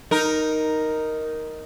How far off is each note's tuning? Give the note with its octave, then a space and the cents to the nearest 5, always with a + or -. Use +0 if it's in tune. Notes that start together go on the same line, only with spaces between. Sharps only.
D#4 +0 A#4 +0